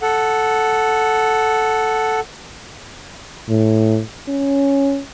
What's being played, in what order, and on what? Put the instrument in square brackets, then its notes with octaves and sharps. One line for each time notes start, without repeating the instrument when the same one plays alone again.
[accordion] A4 F#5
[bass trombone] A2
C#4